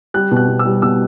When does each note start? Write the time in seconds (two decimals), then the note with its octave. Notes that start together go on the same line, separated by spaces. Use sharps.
0.14 G3 F#6
0.31 B2
0.36 F#6
0.48 B2
0.59 E6
0.65 G3
0.82 B2 E6